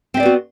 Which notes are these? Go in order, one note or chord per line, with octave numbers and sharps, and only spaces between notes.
B3 C4 F#4 D5 E5